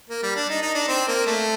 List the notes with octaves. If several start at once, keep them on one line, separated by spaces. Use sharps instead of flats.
A#3
G3
D4
D#4
D#4
D4
C4
A#3
A3